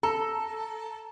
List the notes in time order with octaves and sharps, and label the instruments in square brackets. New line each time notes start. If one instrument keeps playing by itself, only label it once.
[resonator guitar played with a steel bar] A4 [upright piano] A#5